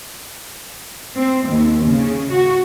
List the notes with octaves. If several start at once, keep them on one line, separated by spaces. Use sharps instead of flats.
C4
D#2
C#3
F#4